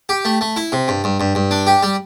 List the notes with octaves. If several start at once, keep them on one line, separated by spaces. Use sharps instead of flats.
G4
A3
A3
E4
C3
G2
G2
G2
G2
D4
G4
G3